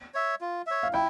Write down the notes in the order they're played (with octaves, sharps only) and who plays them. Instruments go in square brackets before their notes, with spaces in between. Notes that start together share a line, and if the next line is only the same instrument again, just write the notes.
[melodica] C#5 E5
F4
C#5 E5
[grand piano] F5
[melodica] E4 [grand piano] G5